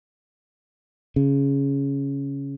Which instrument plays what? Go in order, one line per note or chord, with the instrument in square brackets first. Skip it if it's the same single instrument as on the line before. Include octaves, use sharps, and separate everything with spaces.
[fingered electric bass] C#3